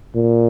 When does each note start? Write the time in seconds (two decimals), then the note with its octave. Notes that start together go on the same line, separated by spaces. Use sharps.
0.15 A#2